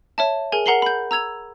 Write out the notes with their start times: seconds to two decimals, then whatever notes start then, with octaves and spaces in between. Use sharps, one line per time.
0.18 C#5 E5 A5
0.52 G#4 A#4 G#5
0.66 A#4 F#5 A#5 C7 F#7 G7
0.82 B5 G6
1.11 A#5 E6 G#6 F7